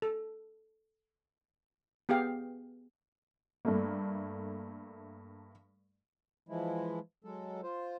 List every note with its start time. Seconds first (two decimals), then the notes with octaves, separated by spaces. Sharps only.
0.02 A4
2.09 B3 G4 G#4 F5 G5
3.65 G2 A3 A#3
6.49 E3 F3 G#3 E4
7.24 F#3 G#3 A4
7.63 F4 C5